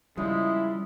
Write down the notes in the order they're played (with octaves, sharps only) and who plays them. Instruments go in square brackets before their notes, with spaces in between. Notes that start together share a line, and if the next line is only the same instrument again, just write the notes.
[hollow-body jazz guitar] C#3 F3 [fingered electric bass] G3 [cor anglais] G#3 [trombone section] E4